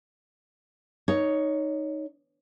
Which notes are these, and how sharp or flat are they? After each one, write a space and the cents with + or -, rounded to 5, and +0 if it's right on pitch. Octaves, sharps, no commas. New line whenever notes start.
D#4 +0 C#5 +10